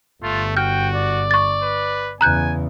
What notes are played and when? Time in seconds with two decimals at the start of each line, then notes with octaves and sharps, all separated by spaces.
0.23 G1 A3 F4
0.57 F#4 G5 F6 G6
0.95 D5
1.31 C#6 A6
1.62 B4
2.21 E2 C#3 G#5 A#5 F#6 G6